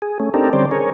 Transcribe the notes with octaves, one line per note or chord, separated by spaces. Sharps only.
G#4
A3 C#4
C4 D4 D#4 G4 A4 A#4
D3 G3 C4 C#4 C5 D5
G#4 A#4 C#5